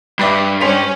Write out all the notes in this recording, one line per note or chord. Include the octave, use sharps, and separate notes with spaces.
G2 B4 D5 E5
C#4 C5 B6 F7